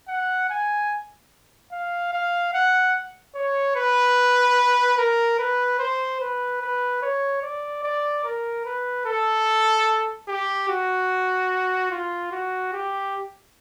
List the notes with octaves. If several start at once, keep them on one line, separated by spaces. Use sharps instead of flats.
F#5
G#5
F5
F5
F#5
C#5
B4
A#4
B4
C5
B4
B4
C#5
D5
D5
A#4
B4
A4
G4
F#4
F4
F#4
G4